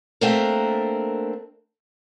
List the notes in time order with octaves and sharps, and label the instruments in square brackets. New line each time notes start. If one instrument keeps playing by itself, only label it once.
[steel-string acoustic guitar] A3 A#3 C4 D4 A#4